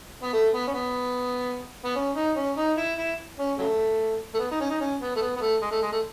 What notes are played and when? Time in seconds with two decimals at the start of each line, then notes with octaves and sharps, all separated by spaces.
0.22 B3
0.33 A3
0.54 B3
0.67 C#4
0.74 B3
1.85 B3
1.96 C#4
2.16 D#4
2.36 C#4
2.57 D#4
2.77 E4
2.97 E4
3.38 C#4
3.58 C#3 F#3 A3
4.34 A3
4.39 B3
4.51 D#4
4.61 C#4
4.70 D#4
4.81 C#4
5.01 B3
5.16 A3
5.21 B3
5.36 B3
5.41 A3
5.61 G#3
5.71 A3
5.82 G#3
5.92 A3